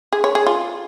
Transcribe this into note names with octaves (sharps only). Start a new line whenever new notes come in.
G#4
C#5
G#4
F4